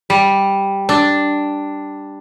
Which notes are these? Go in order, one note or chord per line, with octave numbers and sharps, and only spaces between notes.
G3
D4